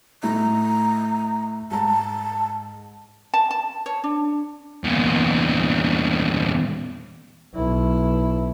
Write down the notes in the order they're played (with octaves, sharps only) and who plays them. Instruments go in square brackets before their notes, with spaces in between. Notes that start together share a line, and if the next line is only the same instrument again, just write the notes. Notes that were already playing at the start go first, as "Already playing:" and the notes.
[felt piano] A2 A3 E4 [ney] A#5
[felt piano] G#2 A#5 [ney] A5
[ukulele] A5
A5
C#5
D4
[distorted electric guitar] E2 A#2
[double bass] B1 E4